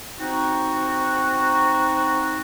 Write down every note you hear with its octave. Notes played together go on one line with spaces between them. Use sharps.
C4 D#4 F#4